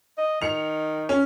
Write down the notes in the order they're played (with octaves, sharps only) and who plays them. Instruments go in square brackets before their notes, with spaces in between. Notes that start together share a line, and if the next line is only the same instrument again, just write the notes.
[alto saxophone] D#5
[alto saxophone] D#3 [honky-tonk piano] C#7 F7
[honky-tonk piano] C#4